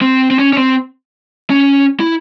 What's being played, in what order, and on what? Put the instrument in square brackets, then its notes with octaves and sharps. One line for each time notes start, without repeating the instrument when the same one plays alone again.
[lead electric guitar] C4
C4
C#4
C#4
C4
C#4
E4